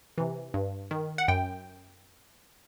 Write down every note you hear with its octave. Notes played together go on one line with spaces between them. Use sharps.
C3 E3
G2
D#3
F#5
F#2 G5